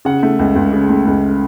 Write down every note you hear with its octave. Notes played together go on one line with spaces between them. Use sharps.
C#3 F#5
A3
C#2
C#2
C#3
A3
C#2